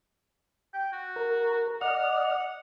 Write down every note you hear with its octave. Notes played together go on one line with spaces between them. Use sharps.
G5
F#4
A#4
D5 D#5 F#5 F6